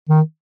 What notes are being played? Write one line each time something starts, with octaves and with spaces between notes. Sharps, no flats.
D#3